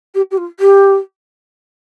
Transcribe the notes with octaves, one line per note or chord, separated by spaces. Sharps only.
G4
G4
F4
G4